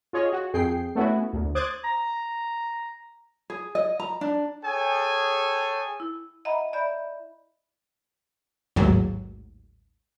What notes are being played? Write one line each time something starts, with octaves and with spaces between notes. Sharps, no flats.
F4 G#4 C#5 D#5
F#4
F2 G#4 G5 C7
A3 B3 C#4 E4 F#4
D2
C5 D6 D#6 F#6 G#6 A6
A#5
G#4
D#5
A#5
D4
G#4 A4 C#5 G5 G#5
E4
D#5 E5 F#5 A#5 B5
D5 E5 B5 G6
A1 D#2 G#2 F#3